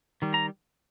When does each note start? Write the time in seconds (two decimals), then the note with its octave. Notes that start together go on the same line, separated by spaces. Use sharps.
0.22 D#3 G3
0.34 A#5